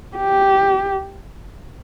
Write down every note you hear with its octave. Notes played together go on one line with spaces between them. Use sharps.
G4